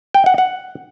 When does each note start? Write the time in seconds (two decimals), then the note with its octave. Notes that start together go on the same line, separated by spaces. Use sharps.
0.14 G5
0.26 F#5
0.38 F#5